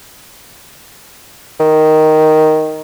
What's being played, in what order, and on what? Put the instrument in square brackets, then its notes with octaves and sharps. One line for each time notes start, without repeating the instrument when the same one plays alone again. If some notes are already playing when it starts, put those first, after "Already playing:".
[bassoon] D#3